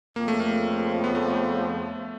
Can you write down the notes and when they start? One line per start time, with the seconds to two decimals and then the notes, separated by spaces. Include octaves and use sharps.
0.16 F2 C#3 F3 A#3
0.28 A3
0.40 A#3
1.04 B3
1.15 A3